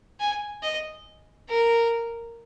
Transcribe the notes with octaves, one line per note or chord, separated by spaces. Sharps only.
G#5
D#5
A#4